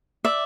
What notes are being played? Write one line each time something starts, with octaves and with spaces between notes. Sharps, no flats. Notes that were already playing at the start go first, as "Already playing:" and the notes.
D5 E5